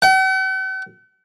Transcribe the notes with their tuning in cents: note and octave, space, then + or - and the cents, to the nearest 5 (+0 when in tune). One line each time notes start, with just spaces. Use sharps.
F#5 +45